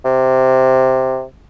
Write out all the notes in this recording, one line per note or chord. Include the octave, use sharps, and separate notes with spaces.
C3